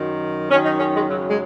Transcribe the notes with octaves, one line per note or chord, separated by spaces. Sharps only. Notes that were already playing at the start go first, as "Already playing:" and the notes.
Already playing: F#2 D#3
F#2 D#3 C#4
D#4
C#4
G#3
F#2 C#3 F#3
G#3